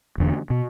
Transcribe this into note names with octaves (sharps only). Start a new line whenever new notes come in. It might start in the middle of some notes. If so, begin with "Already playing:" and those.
E1 E2 D3
B2